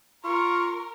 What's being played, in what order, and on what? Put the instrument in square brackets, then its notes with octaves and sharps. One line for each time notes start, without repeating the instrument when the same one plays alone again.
[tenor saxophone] F4 [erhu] A#4 [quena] C#6